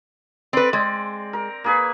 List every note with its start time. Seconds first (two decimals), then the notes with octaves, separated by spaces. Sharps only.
0.53 C4 B4 D5
0.73 G#3 C4 D5
1.33 A#4
1.64 A#3 G#4 B4